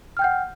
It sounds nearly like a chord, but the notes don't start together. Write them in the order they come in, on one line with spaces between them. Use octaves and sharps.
F6 G5 G6 F#5